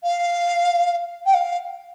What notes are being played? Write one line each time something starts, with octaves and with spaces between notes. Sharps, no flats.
F5
G5
F5